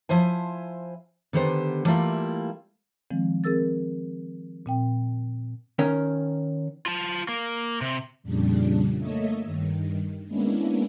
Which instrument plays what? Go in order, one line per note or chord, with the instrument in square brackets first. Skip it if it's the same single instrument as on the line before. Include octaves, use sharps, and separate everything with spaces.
[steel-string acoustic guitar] F3 E4 C5 G#5
D3 D#3 B3 G4 C5
E3 G3 A3 A#3 E4 F4
[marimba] D#3 F3 G#3 C4
C4 G#4 A#4 E6 A6
A#2 C4 G5
[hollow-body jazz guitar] D#3 C#4 A#4
[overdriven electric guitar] F4 A5
A#3
C3
[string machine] F2 A#2 C#3 G3 D4
A3 A#3 A4 C#5 D#5 E5
G2 D#3
G#3 A#3 B3 C#4 D4 E4